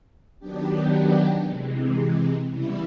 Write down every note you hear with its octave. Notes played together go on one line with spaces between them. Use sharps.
D#3 F#3 B3 D4 G4
C3 E3 G#3
C#3 E3 G3 B3 E4